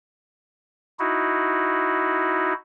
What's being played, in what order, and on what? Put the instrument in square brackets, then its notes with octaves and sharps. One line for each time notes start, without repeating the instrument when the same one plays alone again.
[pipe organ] D#4 E4 F#4